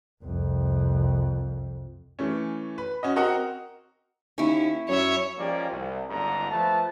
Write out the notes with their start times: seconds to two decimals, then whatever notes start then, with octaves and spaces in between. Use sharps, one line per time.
0.24 C2 F2
2.19 E3 A3 C#4
2.78 B4
3.03 C#4 F#4 D#5
3.16 C4 F#4 A#4 D#5 F#5 A#5
4.38 D#2 C#4 E4
4.88 F#2 C#5 E5
5.38 F3 G#3 A#3 C#4 G4 D5
5.70 C2
6.09 G1 C#2 G#2 D4 A#5
6.51 F3 A3 B4 A5